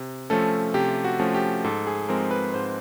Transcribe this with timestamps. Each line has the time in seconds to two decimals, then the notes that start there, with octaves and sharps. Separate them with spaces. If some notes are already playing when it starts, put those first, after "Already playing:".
Already playing: C3
0.30 F3 A3 C#4 A4
0.74 C3 G4
1.04 F#4
1.19 F3 A3 C#4
1.34 G4
1.64 G#2 A4
1.87 G#4
2.09 F3 G#3 C4 A#4
2.31 B4
2.54 G#2 C5